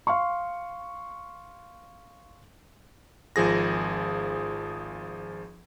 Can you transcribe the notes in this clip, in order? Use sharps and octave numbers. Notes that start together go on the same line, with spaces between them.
F5 C6 C#6
G#1 F3 G#4 A#6